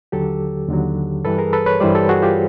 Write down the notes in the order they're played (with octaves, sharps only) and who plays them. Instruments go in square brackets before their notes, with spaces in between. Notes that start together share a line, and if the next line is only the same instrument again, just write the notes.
[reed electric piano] D#2 D3 F#3 G4 A4
D#2 D3 F#3
G2 E3 G3 A4 B4
G#4 A#4
A4 B4
B4 C#5
G2 E3 G3 C5 D5
G4 A4
F#4 G#4
F4 G4